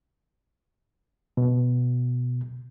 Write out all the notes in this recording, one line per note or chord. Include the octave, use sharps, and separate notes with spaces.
B2